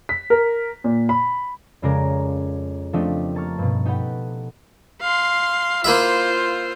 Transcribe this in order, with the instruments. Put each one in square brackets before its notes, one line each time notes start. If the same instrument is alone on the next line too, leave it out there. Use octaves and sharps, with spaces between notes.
[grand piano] B6
A#4
A#2
B5
[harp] F2 C#3 G#3 A#4 D5 A#6
F3 A3 C4 D4 G4 D#5
A#3 A5 C#6 F6
G2 B2
D#4 G4 A4 B4 F#5 G5
[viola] F5 C6
[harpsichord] A#3 E4 E5 [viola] F4 C5